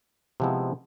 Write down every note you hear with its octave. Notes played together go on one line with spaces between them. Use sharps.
C3 F3 G#3 B3 E4